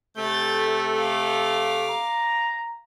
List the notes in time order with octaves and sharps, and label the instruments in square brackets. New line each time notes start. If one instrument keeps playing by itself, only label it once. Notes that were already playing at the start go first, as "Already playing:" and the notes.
[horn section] C3 A3 [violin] G6 A6
[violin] F5 D6
[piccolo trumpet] A#5